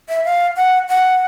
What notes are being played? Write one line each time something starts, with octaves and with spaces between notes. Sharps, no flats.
E5
F5
F#5
F#5